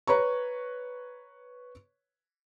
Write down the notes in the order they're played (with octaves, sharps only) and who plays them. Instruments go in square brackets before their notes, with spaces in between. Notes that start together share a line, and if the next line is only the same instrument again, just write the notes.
[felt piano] B4 C#5 A#5 C#6